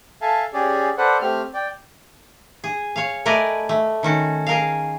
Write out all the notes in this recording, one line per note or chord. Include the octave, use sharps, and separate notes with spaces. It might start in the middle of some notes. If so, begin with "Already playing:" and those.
A4 E5 F5 G#5 A5
C#4 G4 G#4 D5
A4 B4 C5 D5 F#5
A3 C4 G4 F6
D5 G5
G#4
C#5 F5
A3 A#4 B4 D5 D#5 G#5
A3
D#3 C#4 F#4
G#4 A#4 F5